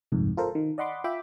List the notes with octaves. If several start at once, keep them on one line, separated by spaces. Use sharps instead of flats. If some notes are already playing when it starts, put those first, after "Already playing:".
G1 C2 F2 G#2
F4 A4 A#4 C5
D#3
D5 D#5 F#5 B5 C6 D6
F4 E5 G5 B5 D6